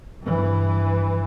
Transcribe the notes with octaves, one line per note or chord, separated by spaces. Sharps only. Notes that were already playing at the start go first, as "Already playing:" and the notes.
G2 E3